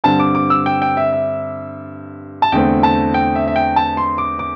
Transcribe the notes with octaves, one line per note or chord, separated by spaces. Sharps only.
G2 D3 C4 A5
D6
D6
E6
G5
G5
E5
E5
A5
E2 D3 A3 C4 G5
A5
G5
E5
E5
G5
A5
C6
D6
D6